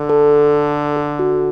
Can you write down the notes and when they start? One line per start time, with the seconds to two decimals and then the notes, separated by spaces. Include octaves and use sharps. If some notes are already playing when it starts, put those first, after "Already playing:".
Already playing: D3
0.09 A4
0.97 A4
1.19 F#4